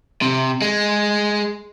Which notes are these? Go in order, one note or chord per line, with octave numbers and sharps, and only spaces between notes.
C3
G#3